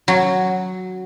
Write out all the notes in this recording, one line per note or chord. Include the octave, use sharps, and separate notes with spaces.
F#3